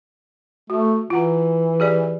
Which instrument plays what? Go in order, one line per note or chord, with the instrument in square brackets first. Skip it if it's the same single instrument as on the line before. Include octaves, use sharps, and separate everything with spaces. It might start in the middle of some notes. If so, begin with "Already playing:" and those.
[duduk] A3 [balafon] F#4
[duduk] E3 [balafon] F4 F#5 A#5
[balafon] G4 G#4 D5